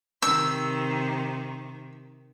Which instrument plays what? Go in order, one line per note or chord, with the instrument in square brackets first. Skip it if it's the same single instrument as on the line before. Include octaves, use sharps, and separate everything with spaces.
[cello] C3 D#3 [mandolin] E6